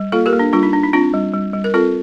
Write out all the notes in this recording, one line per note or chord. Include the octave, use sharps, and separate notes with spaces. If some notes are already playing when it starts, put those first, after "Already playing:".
Already playing: G3
A#3 F4 A4
G4 A#4
A#3
D4
G3 D4 F4
D#4
D4
D#4
C4 D4 F4
G3
G3
G3
A#4
C4 F4 A4